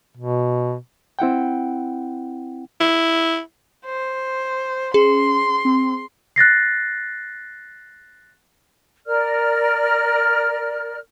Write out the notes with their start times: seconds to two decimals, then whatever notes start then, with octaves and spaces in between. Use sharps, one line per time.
0.17 B2
1.19 C4 E4 F#5 G5
2.80 E4
3.85 C5
4.94 C#4 G#4 C6
5.65 C4
6.36 F#6 A6 A#6 C7
9.06 A#4 D5 F6